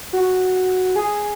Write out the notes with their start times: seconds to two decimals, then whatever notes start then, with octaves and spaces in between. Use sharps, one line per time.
0.13 F#4
0.96 G#4